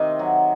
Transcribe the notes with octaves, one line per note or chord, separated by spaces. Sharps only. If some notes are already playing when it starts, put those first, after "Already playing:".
Already playing: C3 D#3 D#5
F#3